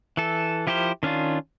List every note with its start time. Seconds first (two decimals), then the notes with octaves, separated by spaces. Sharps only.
0.17 E3 A4
0.67 F3 E4 G4 A#4 C5
1.03 D#3 C#4 D4 F4